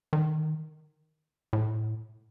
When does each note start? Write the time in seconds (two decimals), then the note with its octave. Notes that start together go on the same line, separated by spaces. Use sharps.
0.13 D#3
1.53 A2